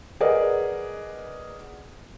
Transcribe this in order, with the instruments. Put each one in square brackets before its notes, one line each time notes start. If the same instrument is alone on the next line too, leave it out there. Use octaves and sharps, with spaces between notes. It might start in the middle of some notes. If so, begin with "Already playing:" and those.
[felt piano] G#4 A#4 B4 D5 D#5 F#5